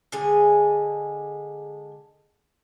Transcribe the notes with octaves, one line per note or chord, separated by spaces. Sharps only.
D3 G#3 G#4